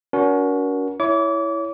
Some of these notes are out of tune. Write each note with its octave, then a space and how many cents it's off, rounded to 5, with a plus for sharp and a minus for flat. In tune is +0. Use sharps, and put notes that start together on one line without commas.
C#4 +45 F#4 +0 A#4 +30
E4 +0 C#5 +15 D6 -30